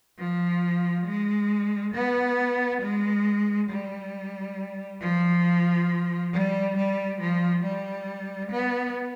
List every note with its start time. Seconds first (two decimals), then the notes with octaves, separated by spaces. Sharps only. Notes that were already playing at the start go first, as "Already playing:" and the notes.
0.18 F3
1.06 G#3
1.94 B3
2.81 G#3
3.69 G3
5.01 F3
6.33 G3
6.77 G3
7.20 F3
7.63 G3
8.51 B3